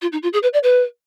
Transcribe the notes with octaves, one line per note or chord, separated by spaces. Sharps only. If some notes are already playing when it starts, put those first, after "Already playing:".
F4
D#4
F4
G#4
B4
D5
B4